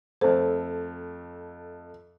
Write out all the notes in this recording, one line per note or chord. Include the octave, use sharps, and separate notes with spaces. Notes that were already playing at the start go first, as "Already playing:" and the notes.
F2 A3 C5